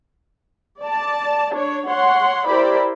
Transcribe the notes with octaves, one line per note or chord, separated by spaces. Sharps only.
D5 A5
D4 C#5
C#5 F#5 C6
E4 G4 A#4 C5 D5 B5